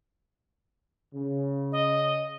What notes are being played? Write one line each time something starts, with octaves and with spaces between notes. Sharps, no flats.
C#3
D#5